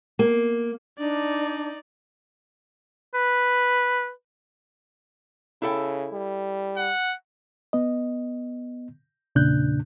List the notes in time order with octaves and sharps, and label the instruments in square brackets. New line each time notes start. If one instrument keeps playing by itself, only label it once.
[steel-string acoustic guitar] A#3
[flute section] D4 [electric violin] D#4 D5
[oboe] B4
[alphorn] C#3 [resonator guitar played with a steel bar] E4 A4 G5
[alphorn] G3
[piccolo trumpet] F#5
[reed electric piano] B3 D#5
E2 A#2 C#3 D4 F#6 G6